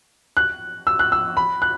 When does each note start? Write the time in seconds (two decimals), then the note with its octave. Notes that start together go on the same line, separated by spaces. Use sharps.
0.37 F#6
0.87 E6
0.99 F#6
1.12 E6
1.37 B5
1.62 F#6